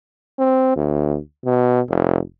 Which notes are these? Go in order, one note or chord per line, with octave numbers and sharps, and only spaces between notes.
C4
D2
B2
F1